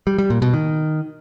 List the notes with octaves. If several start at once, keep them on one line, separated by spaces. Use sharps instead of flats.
G3
G3
A#2
B2
D#3